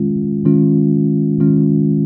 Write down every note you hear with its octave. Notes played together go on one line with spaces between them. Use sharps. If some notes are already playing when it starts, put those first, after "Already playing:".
Already playing: D#3 G#3 C#4 F4
D#3 G#3 C#4 F4
D#3 G#3 C#4 F4